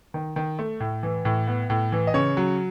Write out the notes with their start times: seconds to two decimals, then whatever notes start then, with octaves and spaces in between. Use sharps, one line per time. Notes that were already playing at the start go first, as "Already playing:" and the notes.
0.14 D#3
0.36 D#3
0.59 A3
0.80 A2
1.03 E3
1.25 A2
1.47 B3
1.70 A2
1.92 E3
2.07 D#5
2.14 C#3 C#5
2.37 F#3